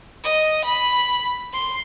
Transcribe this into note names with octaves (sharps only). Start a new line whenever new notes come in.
D#5
B5
C6